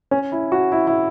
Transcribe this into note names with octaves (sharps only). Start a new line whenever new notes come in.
C#4
E4
F#4
E4
E4